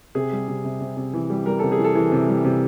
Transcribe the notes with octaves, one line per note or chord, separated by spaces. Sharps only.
C3 G#4
G3
C3
C3
C3
C3
E3
G3
G3 A#4
C3 A4
G#4
E3
A4
E3
C3
G3
C3